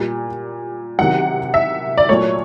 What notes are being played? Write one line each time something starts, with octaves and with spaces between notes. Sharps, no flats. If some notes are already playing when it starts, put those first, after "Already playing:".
Already playing: A#2 G3
C3 D#3 F#3 F#5
E5
D5
A#2 F#3 A3 C#5